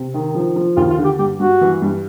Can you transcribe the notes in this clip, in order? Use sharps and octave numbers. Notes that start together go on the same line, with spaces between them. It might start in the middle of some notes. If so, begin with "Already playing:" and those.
Already playing: C3
D#3
F3
F3
D#2 F4
F4
D3
G4
G2 G4
G2 F#4
E3
G2